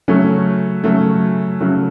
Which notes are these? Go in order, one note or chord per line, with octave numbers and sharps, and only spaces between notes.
C#3 F#3 A3 C#4
C#3 F#3 A3
C#3 F#3 A3